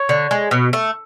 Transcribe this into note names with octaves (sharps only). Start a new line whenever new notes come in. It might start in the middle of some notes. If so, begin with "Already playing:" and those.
Already playing: C#5
D3
G#3
B2
A3